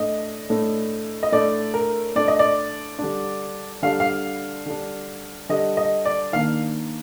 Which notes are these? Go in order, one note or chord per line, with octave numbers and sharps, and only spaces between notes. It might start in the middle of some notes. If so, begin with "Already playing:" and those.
Already playing: A2 A3 D4 D#5
A2 A3 D4
D#5
A2 A3 D4 D5
A#4
A2 A3 D4 D5
D#5
D5
D3 G3 D4
D3 G3 D4 F5
F5
D3 G3 D4
D3 G3 D4 D#5
D#5
D5
D#3 A#3 D4 F5